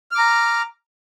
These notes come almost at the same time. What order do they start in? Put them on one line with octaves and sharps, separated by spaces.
F6 D6 A#5